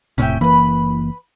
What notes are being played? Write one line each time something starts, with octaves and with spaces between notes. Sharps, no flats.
E1 A2 C3 C#4 E5 G5
F#1 E3 A#3 B4 B5